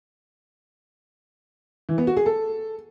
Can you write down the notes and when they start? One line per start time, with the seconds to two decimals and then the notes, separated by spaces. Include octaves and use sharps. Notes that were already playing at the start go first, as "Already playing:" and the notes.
1.89 E3
1.98 B3
2.07 F#4
2.17 G#4
2.26 A4